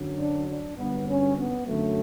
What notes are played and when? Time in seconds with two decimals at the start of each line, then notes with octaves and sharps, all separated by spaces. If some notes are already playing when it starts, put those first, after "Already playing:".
Already playing: F#2 D3 F#3
0.19 D4
0.48 D4
0.78 G2 D3 F#3 B3
1.08 C#4
1.38 B3
1.67 F#2 D3 F#3 A3